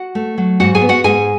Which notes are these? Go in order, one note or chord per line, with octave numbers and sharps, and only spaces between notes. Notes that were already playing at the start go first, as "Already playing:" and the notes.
Already playing: F#4 F#5
A3
F#3
G#2 F#4 F#5
G#4 G#5
B3
F#4 F#5
G#2 G#4 G#5